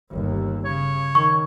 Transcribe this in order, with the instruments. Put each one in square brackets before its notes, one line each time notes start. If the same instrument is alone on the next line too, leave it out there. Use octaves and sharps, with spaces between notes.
[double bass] G1 D#2
[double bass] C#3 [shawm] C#5
[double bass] D#3 [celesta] C#6